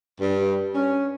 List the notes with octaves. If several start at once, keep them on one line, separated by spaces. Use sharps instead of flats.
G2
C#4